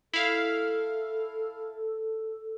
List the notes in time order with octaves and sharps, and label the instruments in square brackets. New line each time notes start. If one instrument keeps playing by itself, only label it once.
[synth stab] E4 F5 [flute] A4